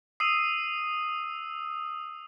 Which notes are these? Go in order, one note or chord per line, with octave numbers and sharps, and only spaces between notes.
D#6 E6 C7 D#7